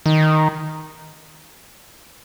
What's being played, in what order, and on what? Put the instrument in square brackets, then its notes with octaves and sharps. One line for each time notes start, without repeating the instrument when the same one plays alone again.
[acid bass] D#3